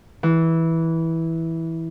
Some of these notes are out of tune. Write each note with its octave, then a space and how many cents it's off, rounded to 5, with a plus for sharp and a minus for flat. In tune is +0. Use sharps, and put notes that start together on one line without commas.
E3 -10